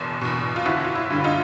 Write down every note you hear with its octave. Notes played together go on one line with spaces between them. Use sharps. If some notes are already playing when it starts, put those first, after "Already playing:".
Already playing: F#1 E2 B2
E2 B2
F4
G1 E4 F#4
F4
E4
G2 D3 G3
D#4 F4